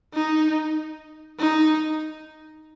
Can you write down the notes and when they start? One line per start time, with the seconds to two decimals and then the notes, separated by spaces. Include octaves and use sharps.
0.14 D#4
1.40 D#4